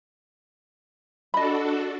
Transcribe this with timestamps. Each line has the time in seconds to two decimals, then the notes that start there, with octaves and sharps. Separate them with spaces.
1.34 D4 F#4 A4 D#5 B5